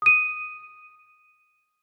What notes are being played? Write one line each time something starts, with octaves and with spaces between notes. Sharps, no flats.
D#6 D#7